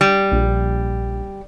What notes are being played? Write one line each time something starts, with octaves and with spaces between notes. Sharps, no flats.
G3
A#1